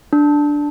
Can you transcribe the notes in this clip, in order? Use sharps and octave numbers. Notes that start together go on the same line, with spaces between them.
D4